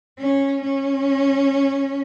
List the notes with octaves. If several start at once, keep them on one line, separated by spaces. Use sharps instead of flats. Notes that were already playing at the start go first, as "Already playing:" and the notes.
C#4
C#4